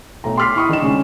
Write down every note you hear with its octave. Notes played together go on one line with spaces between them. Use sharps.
B1 A3 A#5
C6 D6 F6 B6 C7
E4 C#6 D#6
D#3 D4 D#4 E7
C#3 G#3 C#4 D4 G#4